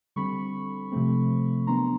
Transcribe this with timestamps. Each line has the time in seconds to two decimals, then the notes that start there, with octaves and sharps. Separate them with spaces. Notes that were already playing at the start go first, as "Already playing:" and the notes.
0.16 D3 G3 C4 B5 C#6
0.92 C3 F3 A3 C4
1.67 D#3 F#3 B3 D4 A#5 C6